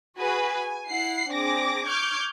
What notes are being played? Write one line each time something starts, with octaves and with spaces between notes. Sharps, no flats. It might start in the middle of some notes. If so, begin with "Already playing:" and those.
F#4 G#4 B4 G#5
G#5
E4 F#5 C7
C4 D4 G#4 D6 A#6
C#6 D6 F6 G6 G#6